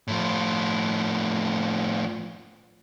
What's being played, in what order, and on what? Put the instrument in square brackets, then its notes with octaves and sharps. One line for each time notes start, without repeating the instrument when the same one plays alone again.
[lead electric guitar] A2 F3